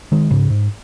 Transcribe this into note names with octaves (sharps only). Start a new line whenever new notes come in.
D#3 G#3
G#2 C#3
G#2